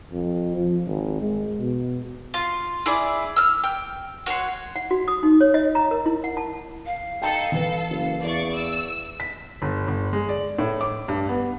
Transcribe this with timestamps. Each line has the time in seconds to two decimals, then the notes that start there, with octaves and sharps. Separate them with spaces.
0.12 F2
0.57 F3
0.87 G#1
1.22 G#3
1.60 B2
2.34 F4
2.86 E4 G#4 D5
3.36 E6 F6
3.64 G5
4.26 F#4 C#5 F#5 C6
4.76 F#5
4.91 F#4
5.08 D#6
5.23 D#4
5.41 C#5
5.54 D#5
5.75 A#5
5.91 A#4
6.06 E4
6.24 F#5
6.37 A5
6.86 F5
7.22 D#4 A4 G5 A5 C#7
7.52 E3 A4 B4
7.89 F#1
8.23 E2 D5 C#6
8.56 E6
9.20 B6
9.62 G1
9.88 G1
10.13 G#3
10.29 D5
10.59 A2
10.81 D6
11.08 G2
11.29 B3